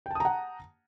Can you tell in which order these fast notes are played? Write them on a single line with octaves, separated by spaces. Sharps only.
G5 A5 D#6 A#5 F#5